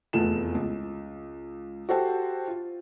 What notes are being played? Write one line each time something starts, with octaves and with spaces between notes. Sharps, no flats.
F1 E2 A3 B3 F4 E7
C#2
F#4 G4 A4 C5 G5 A5
F4